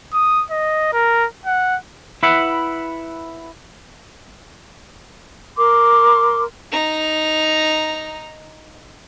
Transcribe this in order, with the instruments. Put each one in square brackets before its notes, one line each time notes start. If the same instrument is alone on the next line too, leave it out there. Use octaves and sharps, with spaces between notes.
[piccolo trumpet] D#6
D#5
A#4
F#5
[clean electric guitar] E4 B4 E5 F#5
[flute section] A#4 C6 D6
[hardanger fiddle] D#4 A#5